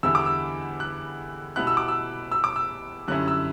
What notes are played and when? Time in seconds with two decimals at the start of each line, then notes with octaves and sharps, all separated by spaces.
0.03 E2 D3 G3 B3 E4 E6
0.15 D6
0.26 E6
0.80 F#6
1.56 B2 G3 B3 E4 F#6
1.67 E6
1.77 D6
1.88 E6
2.32 E6
2.44 D6
2.56 E6
3.07 F#2 D3 G3 C#4 E4 F#6
3.28 E6